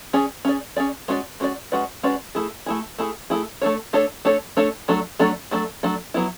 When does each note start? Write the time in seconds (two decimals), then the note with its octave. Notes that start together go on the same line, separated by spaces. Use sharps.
0.13 C#4 G#4 D5
0.45 C#4 G#4 D5
0.77 C#4 G#4 D5
1.08 G#3 C#4 F#4 B4 D5
1.40 G#3 C#4 F#4 B4 D5
1.72 G#3 C#4 F#4 B4 D5
2.03 G#3 C#4 F#4 B4 D5
2.35 A3 E4 G#4
2.66 A3 E4 G#4
2.98 A3 E4 G#4
3.30 A3 E4 G#4
3.62 A3 D4 A4 C#5
3.93 A3 D4 A4 C#5
4.25 A3 D4 A4 C#5
4.57 A3 D4 A4 C#5
4.88 F#3 A3 D4 A4
5.19 F#3 A3 D4 A4
5.51 F#3 A3 D4 A4
5.83 F#3 A3 D4 A4
6.14 F#3 B3 E4